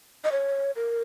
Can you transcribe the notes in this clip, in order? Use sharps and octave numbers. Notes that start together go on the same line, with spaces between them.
D#5
C#5
A#4